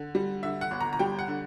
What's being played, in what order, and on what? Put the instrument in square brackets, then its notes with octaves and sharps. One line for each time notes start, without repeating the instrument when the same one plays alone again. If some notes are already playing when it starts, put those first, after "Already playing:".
Already playing: [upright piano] D3
G3
D3 E5
F#5
G1
A#5
A#5
G3 G5
F#5
D3